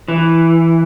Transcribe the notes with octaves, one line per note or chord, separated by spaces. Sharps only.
E3